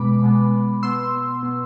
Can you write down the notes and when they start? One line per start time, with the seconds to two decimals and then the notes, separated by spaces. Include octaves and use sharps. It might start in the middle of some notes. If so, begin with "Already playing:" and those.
Already playing: B2 G#3 B3 B5 D6
0.23 B2 G#3 B3
0.83 B2 B3 C6 E6
1.42 B2 B3